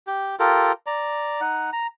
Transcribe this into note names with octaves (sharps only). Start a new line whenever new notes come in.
G4
F4 G4 A4 A#4
D5 A#5
D#4 F#5
A#5